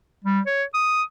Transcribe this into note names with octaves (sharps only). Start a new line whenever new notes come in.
G3
C#5
D#6